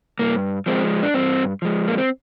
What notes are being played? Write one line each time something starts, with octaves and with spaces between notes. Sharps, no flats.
G2 A#3
F3 G#3 C4
D4
G2 C4
F3 G#3
A#3
C4